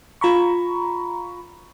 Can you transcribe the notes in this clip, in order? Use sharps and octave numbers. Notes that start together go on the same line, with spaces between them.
F4 A#5 B5 C#6